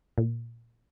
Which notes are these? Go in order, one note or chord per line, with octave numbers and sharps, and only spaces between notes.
A#2